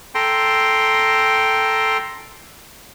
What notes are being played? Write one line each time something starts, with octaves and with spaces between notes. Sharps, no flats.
A4 G5 A#5 C6